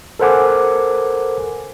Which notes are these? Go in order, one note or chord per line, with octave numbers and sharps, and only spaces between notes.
A4 A#4 C5 F#5 G#5 D6